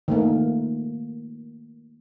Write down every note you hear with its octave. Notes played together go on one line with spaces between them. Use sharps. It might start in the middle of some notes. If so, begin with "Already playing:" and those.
D#3 A3 A#3